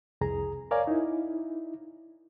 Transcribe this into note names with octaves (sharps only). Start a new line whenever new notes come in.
C2 F2 G#4 A#5
A#4 C#5 D5 F5 G#5 A#5
D#4 E4